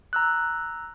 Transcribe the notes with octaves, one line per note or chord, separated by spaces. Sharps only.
A#5 E6 F#6